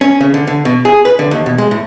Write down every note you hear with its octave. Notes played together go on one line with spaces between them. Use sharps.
C#4
C#3
D3
D3
B2
G#4
B4
D3
D#2
B2
G#3
A2